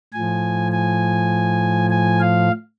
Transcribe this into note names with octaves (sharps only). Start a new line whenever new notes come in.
A2 F3 G#5
G#5
G#5
F5